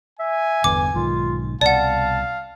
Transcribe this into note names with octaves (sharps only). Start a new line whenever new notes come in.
E5 G#5
G1 E2 D3 E3 D6
B1 G#2 D#3 F4
C2 B2 D5 F5 F#5 A5